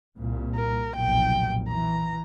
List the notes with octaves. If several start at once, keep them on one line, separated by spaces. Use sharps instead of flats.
C2 A#2
A#4
F1 B1 A#2 G5
E3 A#5